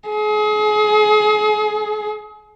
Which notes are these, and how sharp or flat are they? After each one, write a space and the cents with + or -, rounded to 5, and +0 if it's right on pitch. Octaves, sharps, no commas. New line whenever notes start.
G#4 +35